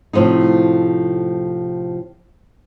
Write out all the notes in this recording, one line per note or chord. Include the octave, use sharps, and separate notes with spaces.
A2 C3 F3 A3 D#4